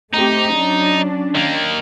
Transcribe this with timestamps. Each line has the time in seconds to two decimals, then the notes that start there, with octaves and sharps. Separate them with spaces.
0.14 A3 C4 D#4 G4
0.55 F#3 C#4 D4
1.35 D#3 A#3